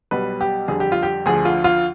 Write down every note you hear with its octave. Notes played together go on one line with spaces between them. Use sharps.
B1 B2 G3 B4
G4
F2 D3 G3 G#4
G4
F4
G4
D2 D3 F3 G#4
F4
F4